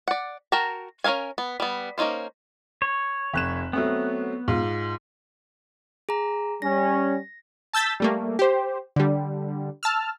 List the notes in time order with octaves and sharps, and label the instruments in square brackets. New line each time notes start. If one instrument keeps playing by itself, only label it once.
[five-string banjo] D5 F#5
F#4 A#4 G5 A5 A#5
C#4 A4 A#4 F5 G#5
B3
G3 B3
A#3 C#4 D#4 F4 C5
[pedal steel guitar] C#5
[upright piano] F1 F#6 E7
[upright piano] F#3 A3 C4 [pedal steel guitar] B3
[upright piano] G#2 F4
[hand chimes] G#4 A#5
[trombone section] G3 C#4 [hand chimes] A#6
[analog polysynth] A5 E6 G6 A6 B6
G3 A3 A#3
G4 C5
D3 G3
A5 E6 F6